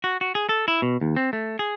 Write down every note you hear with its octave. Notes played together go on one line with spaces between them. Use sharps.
F#4
F#4
G#4
A4
E4
B2
D#2
C4
A3
G#4